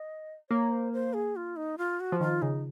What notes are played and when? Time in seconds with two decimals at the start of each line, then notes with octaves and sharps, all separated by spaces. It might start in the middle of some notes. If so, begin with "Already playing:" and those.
Already playing: D#5
0.50 A#3 C#5
0.71 C5
0.93 C5
1.14 G#4
1.36 F4
1.56 D#4
1.78 F4
2.00 F#4
2.12 F3
2.21 D#3 F4
2.42 C#3 D#4